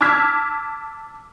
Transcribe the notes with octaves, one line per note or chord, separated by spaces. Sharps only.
A5 D6 E6 F6 G#6 B6